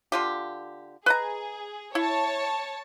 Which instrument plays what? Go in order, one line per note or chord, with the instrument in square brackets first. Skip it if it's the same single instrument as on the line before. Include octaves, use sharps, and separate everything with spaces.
[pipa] D3 F4 G4
[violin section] G#4 [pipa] B4 D#5 A#5
[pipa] E4 [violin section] C#5 A5